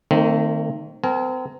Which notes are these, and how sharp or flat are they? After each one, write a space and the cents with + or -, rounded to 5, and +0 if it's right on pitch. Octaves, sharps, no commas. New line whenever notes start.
D#3 -10 A3 +45 C4 +0
C4 -35 A#4 -15 G#5 +30